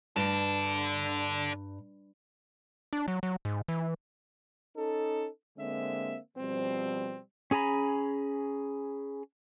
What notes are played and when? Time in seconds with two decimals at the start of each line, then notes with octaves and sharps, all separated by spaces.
0.16 G2 D4 A4
2.93 D4
3.08 F#3
3.23 F#3
3.45 G#2
3.68 E3
4.77 C#4 D#4 A4
5.58 D3 G#3 A#3 C4 E5
6.37 B2 F3 G3 C4
7.51 C#4 G#4 G#5 A#5 B5